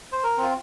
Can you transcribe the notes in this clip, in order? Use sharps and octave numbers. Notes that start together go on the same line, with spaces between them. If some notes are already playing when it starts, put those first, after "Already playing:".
C5
A#4
C4 F4